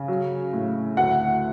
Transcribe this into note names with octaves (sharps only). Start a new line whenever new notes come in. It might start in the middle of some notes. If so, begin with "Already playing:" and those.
Already playing: C#3
F#3
A2
D2 F#5